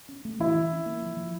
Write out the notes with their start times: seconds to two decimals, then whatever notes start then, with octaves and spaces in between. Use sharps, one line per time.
0.09 C#4
0.25 A3
0.40 E3 E4
0.55 E3
0.72 C#4
0.86 A#3
1.02 F3
1.17 F3